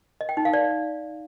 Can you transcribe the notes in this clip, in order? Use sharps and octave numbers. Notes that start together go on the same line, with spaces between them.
D#5
G5
D#4
F5
D5